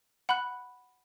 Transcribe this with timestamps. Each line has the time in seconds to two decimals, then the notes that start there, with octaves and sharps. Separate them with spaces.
0.29 F#5 B5 F#6